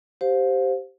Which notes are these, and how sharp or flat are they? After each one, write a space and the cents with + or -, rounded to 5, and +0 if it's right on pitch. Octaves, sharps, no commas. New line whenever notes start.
G4 -10 C5 +0 F5 +25